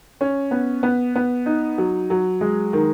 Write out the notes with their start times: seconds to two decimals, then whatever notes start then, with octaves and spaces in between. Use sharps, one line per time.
0.21 C#4
0.51 B3
0.83 B3
1.15 B3
1.46 D#4
1.78 F#3
2.10 F#3
2.41 G#3
2.73 D#3